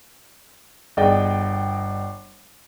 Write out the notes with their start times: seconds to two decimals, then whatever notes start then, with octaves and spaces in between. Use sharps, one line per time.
0.97 G1 G#4 D5 D#5 G5